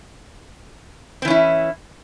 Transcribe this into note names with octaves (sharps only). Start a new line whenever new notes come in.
E3 C4 C#4 E4